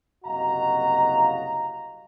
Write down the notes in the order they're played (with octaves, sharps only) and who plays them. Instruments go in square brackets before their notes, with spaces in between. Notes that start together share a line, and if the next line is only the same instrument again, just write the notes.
[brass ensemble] F#1 C2 F#4 D#5 F5 A#5